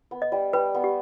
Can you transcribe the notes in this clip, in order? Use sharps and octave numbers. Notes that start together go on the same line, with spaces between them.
B3
D#5
G3
G3 B4
B3
G4